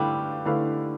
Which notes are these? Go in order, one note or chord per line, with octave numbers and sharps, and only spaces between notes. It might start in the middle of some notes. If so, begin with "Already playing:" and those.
Already playing: D3 G3 A3 E4 B4 F5
D3 A3 E4 B4 F5